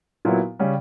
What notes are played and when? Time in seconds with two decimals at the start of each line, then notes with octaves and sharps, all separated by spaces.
0.25 A#2 F#3 B3 E4
0.59 C#3 G3 C#4